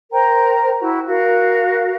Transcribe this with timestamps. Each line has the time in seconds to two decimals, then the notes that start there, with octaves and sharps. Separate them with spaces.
0.12 A#4 C5 G5 A#5
0.80 E4 F#4
1.07 F#4 A#4 F5